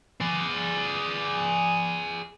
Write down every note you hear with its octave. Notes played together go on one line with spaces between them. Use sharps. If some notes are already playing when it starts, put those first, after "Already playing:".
G#4 D5